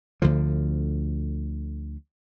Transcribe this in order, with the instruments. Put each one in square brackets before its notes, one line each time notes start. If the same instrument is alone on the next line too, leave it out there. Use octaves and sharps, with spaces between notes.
[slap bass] D2 D3 F3